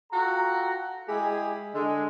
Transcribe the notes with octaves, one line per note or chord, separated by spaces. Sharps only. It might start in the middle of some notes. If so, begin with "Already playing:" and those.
F4 F#4 A4 G5 A#5
G#3 E4 G4 G#4
D3 G#3